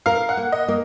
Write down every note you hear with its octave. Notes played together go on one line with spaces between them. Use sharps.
A#4 F5
F#5
A#3
D#5
A#3